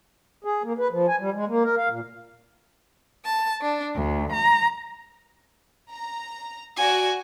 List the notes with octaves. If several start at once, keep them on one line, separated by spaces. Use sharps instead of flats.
G#4
A#3
B4
F3
G#5
G3
G#3
A#3
A#4
F5
A#2
A5
D4
D2
A#5
A#5
F#4 D5 G#5